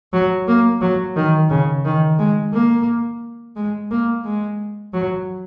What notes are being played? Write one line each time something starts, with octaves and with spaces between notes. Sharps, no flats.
F#3
A#3
F#3
D#3
C#3
D#3
G#3
A#3
G#3
A#3
G#3
F#3